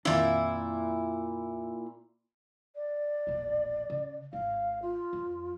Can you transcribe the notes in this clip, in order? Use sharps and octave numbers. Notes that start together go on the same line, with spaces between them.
F2 A#2 D#3 D4 E4
D5
E1 A#1
C#3
G#1 F5
F4
F2